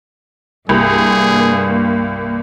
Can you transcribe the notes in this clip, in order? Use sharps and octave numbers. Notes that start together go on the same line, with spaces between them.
C2 G2 A#3 G#4